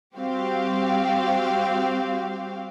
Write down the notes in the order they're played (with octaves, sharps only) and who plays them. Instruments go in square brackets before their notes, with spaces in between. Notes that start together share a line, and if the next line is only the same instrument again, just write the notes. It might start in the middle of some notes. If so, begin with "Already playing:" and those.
[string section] G3 C4 F#4 G4 F5